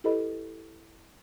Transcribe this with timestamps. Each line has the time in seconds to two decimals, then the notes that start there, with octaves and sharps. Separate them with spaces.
0.04 E4 G4 A4 B4 D#5 B5